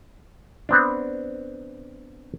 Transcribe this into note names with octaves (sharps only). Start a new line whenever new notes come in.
B3 C4 D4